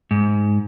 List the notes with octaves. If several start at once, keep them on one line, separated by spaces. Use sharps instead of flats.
G#2